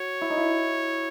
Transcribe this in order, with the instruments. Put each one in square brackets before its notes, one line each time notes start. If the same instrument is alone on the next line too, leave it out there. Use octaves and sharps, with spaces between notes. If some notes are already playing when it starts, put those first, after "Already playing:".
Already playing: [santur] F#4 [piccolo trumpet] C#5
[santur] E4
D#4
E4